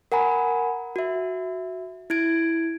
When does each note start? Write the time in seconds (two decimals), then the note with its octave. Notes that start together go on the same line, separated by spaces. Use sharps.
0.12 A#4 F#5 G#5 A#5 B5
0.96 F#4 E5
2.10 E4 G#6 D7